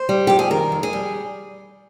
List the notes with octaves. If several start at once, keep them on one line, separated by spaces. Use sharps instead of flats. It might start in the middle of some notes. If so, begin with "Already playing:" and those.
Already playing: C5
G3
F2 G4
G#4
D#3 A#4
F2
G#4
G3